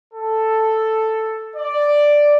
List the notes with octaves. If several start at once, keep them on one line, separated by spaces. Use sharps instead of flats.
A4
D5